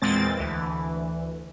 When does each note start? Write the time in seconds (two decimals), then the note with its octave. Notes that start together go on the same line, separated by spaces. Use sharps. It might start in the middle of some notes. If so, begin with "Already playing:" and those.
0.02 E2 A#2 G#3 C4 A6
0.37 D2 E3